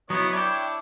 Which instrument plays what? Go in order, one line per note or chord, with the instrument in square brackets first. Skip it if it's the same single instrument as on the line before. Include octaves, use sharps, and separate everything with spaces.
[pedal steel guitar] F#3 E4 [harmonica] B3 C#5 D#5
[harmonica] D4 E4 D6 [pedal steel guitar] C#5 G5